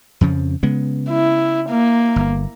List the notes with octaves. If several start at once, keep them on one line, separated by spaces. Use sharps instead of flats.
F2 C#3 F3
C#3 G#3 B3
E4
A#3
G1